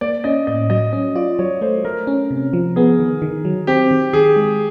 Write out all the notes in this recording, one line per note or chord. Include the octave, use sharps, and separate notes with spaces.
A#3 D5
C#4 D#5
A2 D#5
F#3 D#5
C#4 D#5
F4 D5
F#3 C#5
A3 C5
A3 A#4
C#4
C3
F3
B3 G#4
D#3
D#3
F#3
C4 G4
D#3
D#3 G#4
G#3